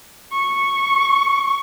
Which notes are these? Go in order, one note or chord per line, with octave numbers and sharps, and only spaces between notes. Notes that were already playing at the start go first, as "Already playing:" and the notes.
C#6